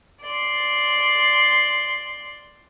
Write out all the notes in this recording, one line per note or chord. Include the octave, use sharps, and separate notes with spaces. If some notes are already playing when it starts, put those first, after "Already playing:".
D5 C6